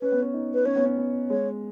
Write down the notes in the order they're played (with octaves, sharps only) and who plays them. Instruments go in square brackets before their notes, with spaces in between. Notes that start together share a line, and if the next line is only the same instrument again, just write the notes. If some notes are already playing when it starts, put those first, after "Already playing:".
[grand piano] C#4 [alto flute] B4
[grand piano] B3
C#4
D#4
[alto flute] B4
[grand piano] C#4 [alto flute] C#5
[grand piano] B3
C#4
B3
[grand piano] G#3 [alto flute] C#5